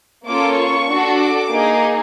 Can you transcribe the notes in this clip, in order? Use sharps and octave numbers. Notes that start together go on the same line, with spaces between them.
A#3 C#4 F4 A4 D6
C#6
D4 F#4 A4
D6
A#3 D#4 G#4